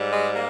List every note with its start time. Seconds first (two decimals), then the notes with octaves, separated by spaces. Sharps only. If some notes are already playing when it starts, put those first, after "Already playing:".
Already playing: G#2 G3
0.13 G#3
0.34 A#3